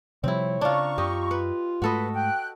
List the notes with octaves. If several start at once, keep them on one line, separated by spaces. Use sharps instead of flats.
C3 F3 G3 C4 E4 C#5
C#3 D4 F4 A#5 C#6
F#2 F4 G4 D#5
B4
G#2 A3 F#4 A4 B4 D#5
G5 F#6